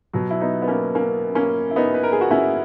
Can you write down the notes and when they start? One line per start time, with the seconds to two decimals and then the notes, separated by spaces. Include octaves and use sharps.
0.13 B2 F#3
0.30 E4
0.41 B3 D#4
0.62 B3
0.68 A#3 C#4
0.95 A#3 C#4
1.35 A#3 C#4
1.71 E4
1.76 B3 D#4
1.94 B4
2.03 A#4
2.12 G#4
2.21 F#4
2.31 C#4 E4